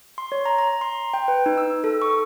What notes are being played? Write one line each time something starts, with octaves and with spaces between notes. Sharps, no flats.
C6
C#5
A#5
A#5
C6
G5
B4
D#4
E6
A4
C#6